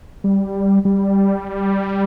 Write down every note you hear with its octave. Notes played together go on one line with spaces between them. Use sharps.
G3
G3